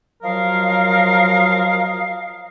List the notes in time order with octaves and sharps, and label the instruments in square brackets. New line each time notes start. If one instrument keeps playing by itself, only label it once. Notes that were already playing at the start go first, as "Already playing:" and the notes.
[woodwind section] F3 F#3 F#4 A#4 D#5 F5